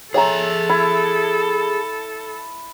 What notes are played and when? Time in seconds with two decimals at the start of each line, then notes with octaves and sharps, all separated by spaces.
0.14 G#4 A4 C#5 E5 G#5 A#5
0.69 E4 B5